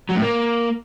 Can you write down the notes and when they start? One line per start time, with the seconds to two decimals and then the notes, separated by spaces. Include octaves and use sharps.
0.09 F#3
0.16 A2
0.22 A#3